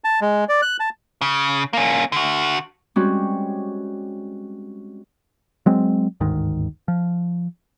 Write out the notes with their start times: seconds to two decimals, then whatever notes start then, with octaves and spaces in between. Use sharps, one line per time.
0.04 A5
0.21 G#3
0.49 D5
0.62 F#6
0.80 A5
1.21 C#3
1.73 A#3 C#4
2.12 D3 F#4
2.96 G3 G#3 C4 C#4 F#4
5.66 F#3 G#3 C4
6.20 G1 D2 G#2 D#3
6.88 F3